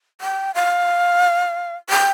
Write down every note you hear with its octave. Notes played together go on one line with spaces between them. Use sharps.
G5
F5
G5